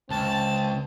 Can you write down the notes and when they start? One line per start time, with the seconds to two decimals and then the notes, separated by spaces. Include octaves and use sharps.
0.10 C#2 C4 A5